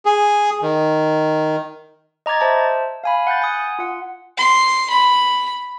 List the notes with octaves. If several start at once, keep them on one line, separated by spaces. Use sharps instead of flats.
G#4
D#3
D#5 A#5 D6 G#6 A6
C5 E5 A5
F5 G#5 B5
F#5 F#6 G6 A6
G#5 D#6
F4 F#5
C6
B5